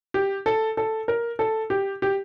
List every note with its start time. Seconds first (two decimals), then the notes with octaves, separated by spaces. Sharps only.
0.14 G4
0.46 A4
0.77 A4
1.08 A#4
1.39 A4
1.70 G4
2.02 G4